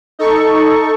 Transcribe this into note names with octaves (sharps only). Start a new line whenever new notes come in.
D#4 A4 C#6